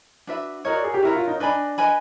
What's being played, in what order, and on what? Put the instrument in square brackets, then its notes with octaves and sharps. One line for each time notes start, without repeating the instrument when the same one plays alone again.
[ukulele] D4 F#4 B4 E5
[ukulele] F#4 A#4 C#5 [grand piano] D#5
[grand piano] D5
G#4
G4
[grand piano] E4 [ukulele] F#4 A#4 C#5
[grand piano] F4
D#4
[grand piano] D4 [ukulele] B4 D#5 G#5 B5
[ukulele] B4 D#5 G#5 B5